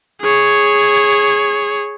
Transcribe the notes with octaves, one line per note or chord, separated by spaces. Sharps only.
G#4 C#5